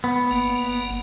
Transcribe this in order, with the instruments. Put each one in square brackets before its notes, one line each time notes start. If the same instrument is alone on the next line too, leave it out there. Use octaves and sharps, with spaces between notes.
[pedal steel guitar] B3
[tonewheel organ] G1 A#3